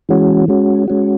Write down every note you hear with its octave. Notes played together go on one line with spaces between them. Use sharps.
E3 G#3 C#4 F#4
G#3 C#4 F#4
G#3 C#4 F#4